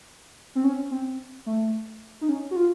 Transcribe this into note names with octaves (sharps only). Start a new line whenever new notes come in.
C4
C#4
C4
A3
D#4
C#4
F#4
F4